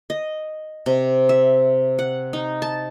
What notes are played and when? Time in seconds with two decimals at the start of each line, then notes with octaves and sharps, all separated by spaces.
0.10 D#5
0.86 C3
1.29 E5
1.99 F#5
2.33 D#4
2.62 A5